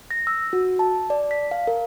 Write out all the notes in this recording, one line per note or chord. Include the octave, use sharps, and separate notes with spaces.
A#6
E6
F#4
A5
D5
B6
F5
A#4